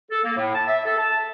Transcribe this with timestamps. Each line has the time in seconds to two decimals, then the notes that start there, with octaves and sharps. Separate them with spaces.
0.11 A4
0.24 A#3
0.37 A2
0.55 A5
0.67 E5
0.85 A4
0.98 A5